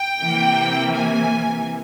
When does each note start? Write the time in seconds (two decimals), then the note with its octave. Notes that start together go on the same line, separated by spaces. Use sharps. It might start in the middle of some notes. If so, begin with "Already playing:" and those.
Already playing: G5
0.18 C3 E3 A#3
0.94 G#5